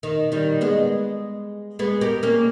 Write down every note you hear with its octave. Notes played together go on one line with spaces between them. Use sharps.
D#3
D#3 G3
G#3 B3
G#3 B3
G4 A#4
A#3 C#4